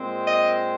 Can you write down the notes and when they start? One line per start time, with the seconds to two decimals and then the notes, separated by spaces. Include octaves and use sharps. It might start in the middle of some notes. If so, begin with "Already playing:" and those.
Already playing: A#2 G#3 C4
0.26 D#5